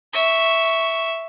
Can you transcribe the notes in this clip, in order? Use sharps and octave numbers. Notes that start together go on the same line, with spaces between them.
E5 C#6